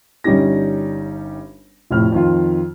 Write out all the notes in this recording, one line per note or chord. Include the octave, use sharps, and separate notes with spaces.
G1 G3 C#4 D#4 G4 A#6
F1 F2 A2 F6
F2 D#3 F4